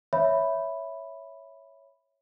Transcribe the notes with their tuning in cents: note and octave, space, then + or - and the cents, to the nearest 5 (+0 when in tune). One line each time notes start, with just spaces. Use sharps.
C#5 +0 E5 +0 B5 +0